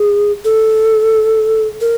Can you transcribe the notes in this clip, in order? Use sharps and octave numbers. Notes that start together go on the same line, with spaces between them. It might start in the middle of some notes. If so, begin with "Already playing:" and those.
Already playing: G#4
A4
A#4